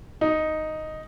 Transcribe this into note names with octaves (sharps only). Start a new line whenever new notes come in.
D#4